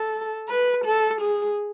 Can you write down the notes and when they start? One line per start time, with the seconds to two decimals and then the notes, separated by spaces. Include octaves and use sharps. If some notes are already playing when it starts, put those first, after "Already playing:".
Already playing: A4
0.49 B4
0.85 A4
1.21 G#4